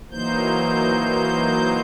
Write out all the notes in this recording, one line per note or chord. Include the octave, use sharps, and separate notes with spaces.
E3 F#3 A#3 D#4 C5 G6